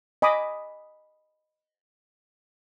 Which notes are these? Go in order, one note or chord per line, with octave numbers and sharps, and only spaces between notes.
D#5 G#5 B5 D6 D#6